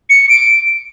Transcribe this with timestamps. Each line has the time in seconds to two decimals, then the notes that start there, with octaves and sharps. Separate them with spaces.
0.10 C#7
0.29 D7